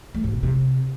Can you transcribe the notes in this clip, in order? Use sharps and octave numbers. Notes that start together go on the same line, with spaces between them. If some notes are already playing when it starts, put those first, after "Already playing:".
A3
G#2
B2
C3